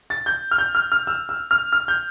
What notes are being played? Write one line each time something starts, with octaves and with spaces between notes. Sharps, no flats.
A6
G6
F6
G6
F6
F6
E6
E6
F6
F6
G6